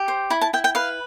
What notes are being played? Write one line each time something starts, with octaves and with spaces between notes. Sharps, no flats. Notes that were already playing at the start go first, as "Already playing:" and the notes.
Already playing: G4
C5
E4 B5
A5
E4 G5
G5
B4 F5